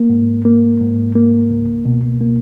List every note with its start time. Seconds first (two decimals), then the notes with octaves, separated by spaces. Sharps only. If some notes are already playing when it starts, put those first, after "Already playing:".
Already playing: A#3
0.10 G#2
0.45 A#3
0.80 G#2
1.15 A#3
1.50 C#2
1.85 B2
2.21 A#3